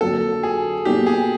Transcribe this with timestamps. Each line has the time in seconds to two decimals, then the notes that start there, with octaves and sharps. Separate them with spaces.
0.01 F2 D3 F#3 A#3 D4 A4
0.43 G#4
0.85 B2 F#3 A#3 D#4 G4
1.06 G#4